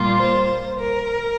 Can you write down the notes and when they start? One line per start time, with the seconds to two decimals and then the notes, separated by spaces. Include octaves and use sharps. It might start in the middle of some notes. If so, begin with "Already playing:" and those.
Already playing: A#2 G3 A#3 F4
0.17 C5
0.79 A#4